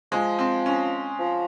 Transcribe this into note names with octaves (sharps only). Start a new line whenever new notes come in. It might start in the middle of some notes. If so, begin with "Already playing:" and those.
F3 G#3
C4
C#4
F3